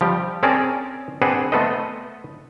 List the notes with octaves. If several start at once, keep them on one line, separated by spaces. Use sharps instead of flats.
F3 G3 G4
C4 C#4 G#4 A#4 D5 A5
C4 D4 G#4 B4 C5 F#5
A3 B3 A4 B4 C5 D#5